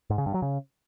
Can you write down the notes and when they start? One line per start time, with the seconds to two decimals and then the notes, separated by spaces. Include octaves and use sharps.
0.10 G#2
0.18 C#3
0.26 G2
0.34 F#3
0.42 C#3